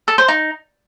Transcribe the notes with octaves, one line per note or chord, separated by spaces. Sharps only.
A4
C5
D#4